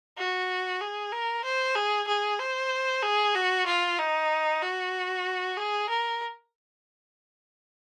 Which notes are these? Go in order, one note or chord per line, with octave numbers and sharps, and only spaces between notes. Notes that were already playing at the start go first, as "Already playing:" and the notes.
F#4
G#4
A#4
C5
G#4
G#4
C5
G#4
F#4
F4
D#4
F#4
G#4
A#4